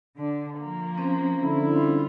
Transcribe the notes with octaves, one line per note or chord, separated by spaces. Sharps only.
D3 D4
F3 A#3
C4 C#4 C5
D3 E4
G3 F4